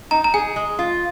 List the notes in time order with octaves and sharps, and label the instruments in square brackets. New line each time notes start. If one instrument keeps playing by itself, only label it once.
[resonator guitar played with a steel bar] D#4 [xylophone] A#5
[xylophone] A#5
[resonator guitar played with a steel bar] G#4 [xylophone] G#5
[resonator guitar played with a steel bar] G#3
F4